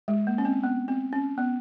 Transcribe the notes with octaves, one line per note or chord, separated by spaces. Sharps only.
G#3
A#3
C#4
C4
B3
C4
C#4
B3